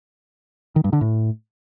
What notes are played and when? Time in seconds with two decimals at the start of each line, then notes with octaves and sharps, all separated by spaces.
0.76 D#3
0.84 G2
0.93 D3
1.01 A2